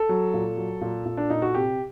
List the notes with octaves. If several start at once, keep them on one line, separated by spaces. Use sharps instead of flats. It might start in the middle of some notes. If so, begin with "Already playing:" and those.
Already playing: A4
F#3
A#2
F#3
A#2
A#2
D4
A#2 D#4
F#4
C3 G4